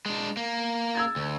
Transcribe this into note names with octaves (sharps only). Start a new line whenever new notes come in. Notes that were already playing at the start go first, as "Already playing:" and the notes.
G#3 D4
A#3
E6 G#6 A6
D2